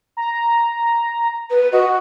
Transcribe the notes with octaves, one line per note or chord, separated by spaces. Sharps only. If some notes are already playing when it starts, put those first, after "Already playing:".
A#5
B4
F#4 D#5